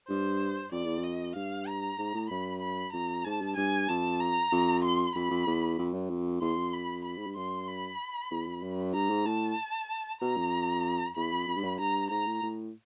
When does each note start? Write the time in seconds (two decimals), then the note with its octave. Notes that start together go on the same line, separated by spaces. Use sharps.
0.08 G2 C5
0.72 F2 D5
0.85 E2
0.98 F2
1.04 D#5
1.36 G2 F5
1.67 A#5
1.98 G#2
2.14 A2
2.30 F#2 B5
2.62 B5
2.93 F2 A#5
3.25 G#2 A5
3.42 G2
3.57 G2 G#5
3.88 F2 A5
4.20 A#5
4.52 F2
4.83 C6
5.15 F2 B5
5.30 F2
5.47 E2
5.79 F2
5.94 F#2
6.10 F2
6.41 E2 C6
6.57 F2
6.73 B5
7.05 B5
7.18 G#2
7.27 G2
7.37 F#2 C6
7.68 B5
8.31 E2
8.47 F2
8.63 F#2
8.94 G2 A#5
9.10 G#2
9.26 A2 A5
10.21 B2 A#5
10.37 F2
11.16 E2 B5
11.32 F2
11.47 F2
11.56 G2
11.64 F#2
11.79 G2 A#5
12.10 G#2 A#5
12.26 A2
12.42 A2